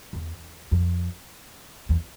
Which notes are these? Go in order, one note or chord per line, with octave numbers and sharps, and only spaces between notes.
E2
F2
E2